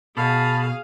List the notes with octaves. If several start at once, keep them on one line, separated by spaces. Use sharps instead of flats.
B2 G#4 F5 A5 B5